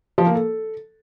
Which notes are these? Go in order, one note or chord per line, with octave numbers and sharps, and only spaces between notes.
F3
A#3
A4